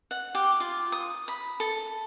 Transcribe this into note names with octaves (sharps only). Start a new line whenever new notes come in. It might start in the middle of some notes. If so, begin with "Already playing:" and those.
F#5
G4
F4
D#6
B5
A4